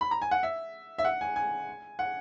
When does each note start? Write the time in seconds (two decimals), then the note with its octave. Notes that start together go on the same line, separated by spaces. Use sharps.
0.01 B5
0.11 A#5
0.22 G#5
0.31 F#5
0.43 E5
0.98 E5
1.05 F#5
1.21 G#5
1.36 G#5
1.99 F#5